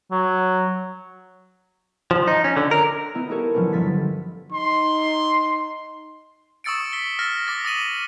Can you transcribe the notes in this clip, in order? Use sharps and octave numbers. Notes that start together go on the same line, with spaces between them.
F#3
F3
D#4
C#4
D3
A#4
B3 D#4 E4
D#4 E4 G4 A4 A#4 C#5
F3 F#3 B3 C#4 D4 B4
G1 F3 D#4 C#5 A6 B6
D#4 C6
C#6 D#6 E6 A6 C#7 D7
B6 G7
E6 F6 A6 A#6
D6 A6 A#6
D#6 A6 D#7 F#7